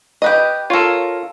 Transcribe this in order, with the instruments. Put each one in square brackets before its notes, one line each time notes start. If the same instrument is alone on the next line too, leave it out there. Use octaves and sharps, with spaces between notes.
[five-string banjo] G4 B4 D#5
[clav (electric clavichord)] F4 A4 [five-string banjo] A#4 C#5